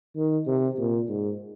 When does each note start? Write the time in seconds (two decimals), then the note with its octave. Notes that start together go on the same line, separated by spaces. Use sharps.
0.16 D#3
0.47 C3
0.78 A#2
1.08 G#2